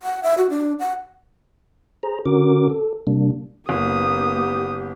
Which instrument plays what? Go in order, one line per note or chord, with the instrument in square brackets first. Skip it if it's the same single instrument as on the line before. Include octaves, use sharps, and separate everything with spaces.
[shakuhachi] F#5
E5
F#4
D4
F#5
[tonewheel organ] G#4 C5 A#5
D3 C#4 F#4 A#4 D6
A4
C3 G3 A#3 D4
[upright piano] F#1 [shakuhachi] A#3 [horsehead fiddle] B3 G4 [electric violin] D#6